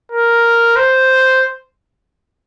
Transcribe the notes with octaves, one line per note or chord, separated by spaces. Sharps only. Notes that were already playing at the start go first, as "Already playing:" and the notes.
A#4
C5